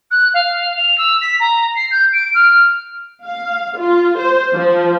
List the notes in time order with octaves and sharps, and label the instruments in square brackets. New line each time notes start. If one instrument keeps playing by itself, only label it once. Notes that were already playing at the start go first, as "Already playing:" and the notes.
[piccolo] F#6
F5
F7
E6
B6
A#5
C7
G6
D7
F6
[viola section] F5
F4
C5
F3